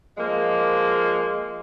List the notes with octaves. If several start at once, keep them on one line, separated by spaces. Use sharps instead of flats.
F3 G#3 A#3